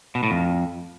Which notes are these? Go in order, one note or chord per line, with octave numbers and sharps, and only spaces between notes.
B2
A2
F2